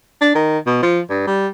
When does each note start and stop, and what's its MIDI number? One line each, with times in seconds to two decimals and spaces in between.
0.21 0.33 62
0.35 0.58 51
0.66 0.78 47
0.83 1.00 53
1.10 1.23 43
1.27 1.48 55